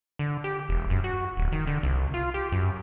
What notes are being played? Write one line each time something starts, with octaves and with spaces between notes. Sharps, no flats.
D3
G4
E1
F#2
F#4
D1
D#3
D3
C2
F4
G4
F#2